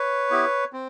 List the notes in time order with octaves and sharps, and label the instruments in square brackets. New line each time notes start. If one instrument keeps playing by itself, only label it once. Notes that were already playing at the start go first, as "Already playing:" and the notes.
Already playing: [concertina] B4 C#5
B3 E4 G4
C4